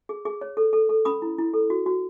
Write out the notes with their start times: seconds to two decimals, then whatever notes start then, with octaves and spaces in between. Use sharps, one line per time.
0.09 G#4
0.25 G#4
0.41 C#5
0.57 A4
0.73 A4
0.89 A4
1.05 C#4 B5 D#6
1.22 E4
1.38 E4
1.54 A4
1.70 F#4
1.86 F#4